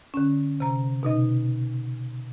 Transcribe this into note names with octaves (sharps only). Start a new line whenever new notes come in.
D3 C#4
C3 A#5
B2 D#4 D#5